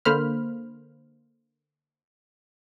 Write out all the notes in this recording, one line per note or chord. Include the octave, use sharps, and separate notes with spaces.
D3 A#3 C5 B5 F6